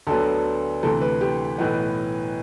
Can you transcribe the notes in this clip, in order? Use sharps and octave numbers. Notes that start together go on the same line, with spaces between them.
D2 D3 F#3 B3 A4
D2 C3 E3 A3 A4
B4
G4
B1 A2 E3 B3